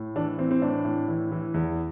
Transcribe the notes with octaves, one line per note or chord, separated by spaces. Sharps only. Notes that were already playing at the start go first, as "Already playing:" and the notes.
Already playing: A2
E3 D4
E3 C4
C4
A2 D4
A2
E3
E3
E2